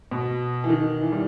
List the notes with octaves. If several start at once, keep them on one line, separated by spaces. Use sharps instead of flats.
B2
E3
D#3
E3
G3